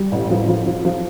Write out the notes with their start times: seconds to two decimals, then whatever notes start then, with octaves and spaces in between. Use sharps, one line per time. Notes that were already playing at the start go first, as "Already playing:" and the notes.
Already playing: G3
0.12 A1
0.30 F3
0.48 F3
0.66 F3
0.85 F3